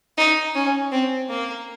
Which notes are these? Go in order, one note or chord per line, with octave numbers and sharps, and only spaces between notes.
D#4
C#4
C4
A#3